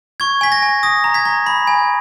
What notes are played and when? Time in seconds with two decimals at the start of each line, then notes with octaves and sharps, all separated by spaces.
0.20 C#6 G#6
0.41 G#5 B6
0.52 A#6
0.62 G#5
0.83 D#6 A#6
1.04 A#5
1.14 G#6 B6
1.25 A#5
1.46 B5
1.67 G#5